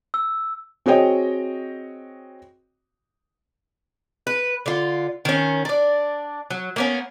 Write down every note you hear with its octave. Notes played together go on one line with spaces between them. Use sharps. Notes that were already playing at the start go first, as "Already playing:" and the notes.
E6
C4 F#4 G#4 C#5 D#5 G5
B4
D3 F4
D#3 C#4
D4 D5
F#3
A#3 B3 C#4